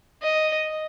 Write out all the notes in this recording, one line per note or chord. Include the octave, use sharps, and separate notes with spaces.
D#5